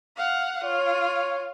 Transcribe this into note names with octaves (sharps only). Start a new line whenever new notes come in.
F5 F#5
F4 C#5